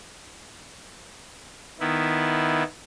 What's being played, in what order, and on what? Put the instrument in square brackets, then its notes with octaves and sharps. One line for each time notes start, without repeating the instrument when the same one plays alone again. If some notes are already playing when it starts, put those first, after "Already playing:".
[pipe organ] D#3 B3 E4